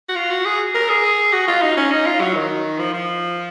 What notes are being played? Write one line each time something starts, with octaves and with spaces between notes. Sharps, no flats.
F#4
F4
F#4
G#4
A#4
G#4
F#4
F4
D#4
C#4
D#4
F4
F#3
D#3
F3
F3